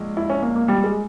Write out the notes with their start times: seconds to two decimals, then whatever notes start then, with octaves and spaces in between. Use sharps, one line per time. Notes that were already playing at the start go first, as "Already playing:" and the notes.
Already playing: A#1 G#3
0.17 E4
0.30 C#4
0.42 A#3
0.56 A#3
0.68 G3
0.84 G#3